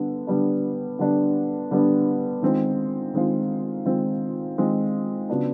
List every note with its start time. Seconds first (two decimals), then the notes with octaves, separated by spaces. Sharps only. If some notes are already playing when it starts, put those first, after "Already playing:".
Already playing: D3 G3 B3 D4
0.27 D3 G3 B3 D4
0.99 D3 G3 B3 D4
1.71 D3 G3 B3 D4
2.42 D#3 G#3 C4 F4
3.14 D#3 G#3 C4 F4
3.85 D#3 G#3 C4 F4
4.58 D#3 G#3 C4 F4
5.29 C#3 F#3 B3 D4 F4